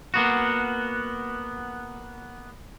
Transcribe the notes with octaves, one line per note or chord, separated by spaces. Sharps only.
A#3 B3 F#4